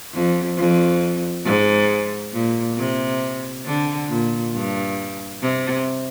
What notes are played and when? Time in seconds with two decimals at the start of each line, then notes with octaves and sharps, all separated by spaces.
0.13 F2
0.57 F2
1.45 G#2
2.33 A#2
2.77 C3
3.66 D3
4.09 A#2
4.53 G2
5.41 C3